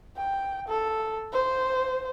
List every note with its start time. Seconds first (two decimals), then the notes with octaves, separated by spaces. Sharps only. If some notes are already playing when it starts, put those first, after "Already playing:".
0.17 G5
0.68 A4
1.33 C5